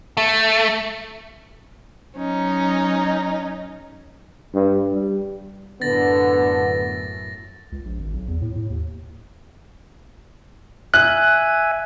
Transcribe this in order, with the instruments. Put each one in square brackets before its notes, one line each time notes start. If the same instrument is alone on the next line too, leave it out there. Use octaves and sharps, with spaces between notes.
[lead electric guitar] A3
[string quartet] F#3 C#4 D#4
[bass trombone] G2
G3
[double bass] F#2 A2 [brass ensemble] D3 [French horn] B3 [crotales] A6 A#6
[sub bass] C#2
A#1
G#1
B1
E2
A2
A2
D#2
[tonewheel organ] E5 G#5 [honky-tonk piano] F#6